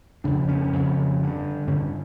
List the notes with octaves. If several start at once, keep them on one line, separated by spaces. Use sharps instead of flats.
F2 C#3 D4
C#4
F2 C#3
G2 D3
G2 D3 C#4